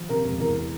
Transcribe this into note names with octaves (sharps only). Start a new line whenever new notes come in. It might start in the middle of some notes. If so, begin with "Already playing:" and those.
Already playing: F3
C3 A#4
E1
E2 A#4